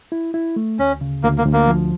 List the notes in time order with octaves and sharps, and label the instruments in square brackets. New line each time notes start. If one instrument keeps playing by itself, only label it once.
[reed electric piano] E4
E4
A3
[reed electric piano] D2 [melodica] C#4
[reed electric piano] C#3
[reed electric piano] D2 [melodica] A#3
[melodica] A#3
[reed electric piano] D2
[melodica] A#3
[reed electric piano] F3